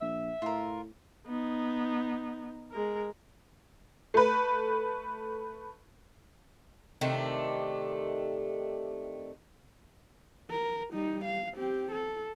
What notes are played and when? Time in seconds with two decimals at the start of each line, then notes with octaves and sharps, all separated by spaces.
0.01 A#1 E5
0.42 A2 F4 A#4
1.27 B3 D#4
2.72 G#3 A#4
4.14 A3 B4
7.01 C3 D#3 A3 D4
10.50 A#4
10.92 G3 D#4
11.25 F5
11.54 C4 G4
11.92 A4